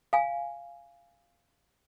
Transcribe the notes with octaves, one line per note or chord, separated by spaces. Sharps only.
F5 G#5